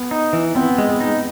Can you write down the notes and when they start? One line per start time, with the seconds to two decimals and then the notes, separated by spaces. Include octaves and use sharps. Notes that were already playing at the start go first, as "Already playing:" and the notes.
Already playing: B3
0.11 D#4
0.33 E3
0.55 B3 C4
0.78 G#3
0.89 B3
1.00 D#4